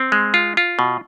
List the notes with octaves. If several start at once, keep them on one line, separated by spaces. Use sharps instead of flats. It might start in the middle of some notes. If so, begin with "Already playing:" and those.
Already playing: C4
G#3
F4
F4
B2